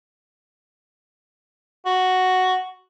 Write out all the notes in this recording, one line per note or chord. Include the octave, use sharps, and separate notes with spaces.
F#4